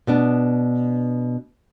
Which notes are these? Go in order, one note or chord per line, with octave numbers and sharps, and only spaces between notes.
B2 B3 D4